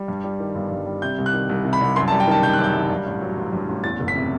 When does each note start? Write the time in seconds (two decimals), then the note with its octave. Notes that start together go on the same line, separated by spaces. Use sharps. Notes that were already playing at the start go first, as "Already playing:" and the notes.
Already playing: G3
0.08 G2
0.24 G3
0.40 D#3
0.55 G1
0.71 G2
0.86 G3
1.02 C3 G6
1.18 C2
1.26 F#6
1.33 D#3
1.49 C2
1.65 C3
1.73 B5
1.81 C2
1.96 F#2 C6
2.08 A5
2.12 G3
2.20 G5
2.27 D#3 A5
2.43 F#1 G6
2.53 F#6
2.59 F#2 G6
2.74 G3
2.90 G2
3.06 A1
3.21 F#3
3.37 A1
3.53 G2
3.69 A1
3.84 E2 A6
4.00 F#1
4.08 B6
4.15 C3